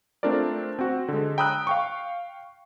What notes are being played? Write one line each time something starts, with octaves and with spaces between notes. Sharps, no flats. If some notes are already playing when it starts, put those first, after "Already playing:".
A3 C4 D4 F4 A#4 D5
C4 F#4
D3 G#3
G5 A#5 B5 D#6 E6 F#6
F5 G5 C#6